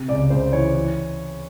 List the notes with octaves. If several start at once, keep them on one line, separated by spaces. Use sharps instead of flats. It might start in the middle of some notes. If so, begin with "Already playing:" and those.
Already playing: C3
C#2 D5
C#2 C5
E3 C#5
E3